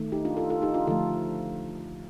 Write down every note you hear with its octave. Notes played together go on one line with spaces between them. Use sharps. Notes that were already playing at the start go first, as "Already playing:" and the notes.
Already playing: D#3 A3
D#4 G4
D4 F4
F4 A4
F4 A4
D#4 G4
D4 F4
D3 F3 A3 F4 A4